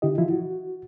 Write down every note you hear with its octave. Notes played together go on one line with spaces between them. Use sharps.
D3 E4 G4 D#5
E3 F3 E4 F4
F#4